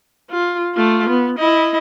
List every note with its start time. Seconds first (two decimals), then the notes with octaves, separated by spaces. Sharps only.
0.30 F4
0.74 A3 F4
1.10 B3
1.39 E4 D#5